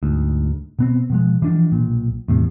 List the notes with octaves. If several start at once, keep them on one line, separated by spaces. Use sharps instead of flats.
D2 G#2
B2 B3 C4
B2 F3 G#3
E3 F3 C#4 D4
B1 A#2
E2 A2 C3